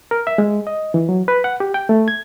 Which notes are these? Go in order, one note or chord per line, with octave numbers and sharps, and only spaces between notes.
A#4
E5
G#3
D#5
E3
F#3
B4
F#5
G4
G5
A3
G#6